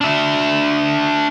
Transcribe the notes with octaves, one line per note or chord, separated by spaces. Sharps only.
D4 E5